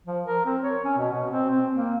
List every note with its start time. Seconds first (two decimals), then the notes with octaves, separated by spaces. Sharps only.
0.07 F3
0.26 A#4
0.46 C4
0.62 C#5
0.85 C#4
0.98 B2
1.13 B2
1.31 C4
1.50 C4
1.73 A#3